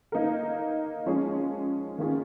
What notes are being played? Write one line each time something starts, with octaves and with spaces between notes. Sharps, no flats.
A#3 D#4 A#4
F3 G#3 C#4 G#4 C#5
D#3 A#3 C#4 F4 G#4